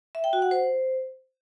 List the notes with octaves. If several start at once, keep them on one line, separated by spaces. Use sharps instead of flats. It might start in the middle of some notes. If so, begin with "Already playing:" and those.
E5
G5
F#4
F#5
C5